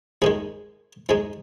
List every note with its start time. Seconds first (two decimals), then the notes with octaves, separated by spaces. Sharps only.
0.22 G#2 D#3 G#3 G#4
1.09 G#2 G#3 G#4